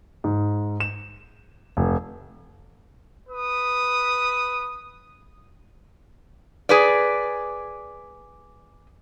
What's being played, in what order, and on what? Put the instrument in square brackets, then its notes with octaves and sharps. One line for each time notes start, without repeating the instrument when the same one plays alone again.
[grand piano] G#2
E7
F1
[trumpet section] B4 D#6
[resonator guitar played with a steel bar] G#4 B4 D5